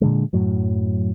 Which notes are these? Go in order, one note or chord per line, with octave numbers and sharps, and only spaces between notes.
A#2 D3 G#3
F#2 A2 F#3